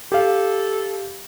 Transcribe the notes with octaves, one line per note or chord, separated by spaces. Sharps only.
G4 A4 F5